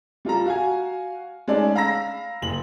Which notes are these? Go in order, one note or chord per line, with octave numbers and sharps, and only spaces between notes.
G3 F4 A4 A#5
F#4 F5 G#5
G#3 A3 C#4 D#4 A4 D5
F5 A#5 B5 E6 A#6
F#1 F#7